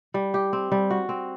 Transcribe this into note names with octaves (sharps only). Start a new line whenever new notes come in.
G3
G4
C4
G3
F#4
C4